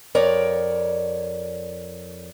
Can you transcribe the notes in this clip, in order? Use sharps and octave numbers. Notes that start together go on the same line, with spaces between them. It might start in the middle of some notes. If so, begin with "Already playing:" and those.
F2 A#4 C#5 D5